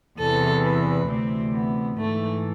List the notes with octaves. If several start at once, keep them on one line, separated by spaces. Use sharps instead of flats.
E2 C3 E3 A4
B4
D2 C3 E3 C4
B3
G#2 E3 A3